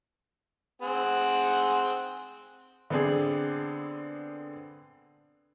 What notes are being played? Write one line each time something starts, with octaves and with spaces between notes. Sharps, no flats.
C4 G#4 F#5
D3 B3 C4 D4 G#4